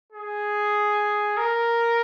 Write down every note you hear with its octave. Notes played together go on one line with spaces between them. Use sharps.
G#4
A#4